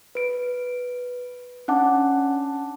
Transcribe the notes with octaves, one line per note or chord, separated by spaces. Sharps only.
B4 D7
C#4 D4 F#5 A5 D6